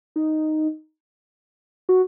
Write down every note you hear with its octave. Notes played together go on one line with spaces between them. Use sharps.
D#4
F#4